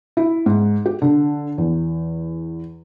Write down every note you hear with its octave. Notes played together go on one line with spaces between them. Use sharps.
E4
G#2
G4
D3
E2